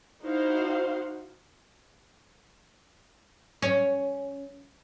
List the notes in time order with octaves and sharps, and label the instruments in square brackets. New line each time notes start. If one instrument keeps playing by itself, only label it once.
[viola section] D#4 E4 F#4 C5 F5 F#5
[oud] C#4